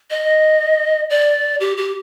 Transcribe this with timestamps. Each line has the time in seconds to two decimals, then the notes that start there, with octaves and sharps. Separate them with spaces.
0.11 D#5
1.10 D5
1.60 G4
1.77 G4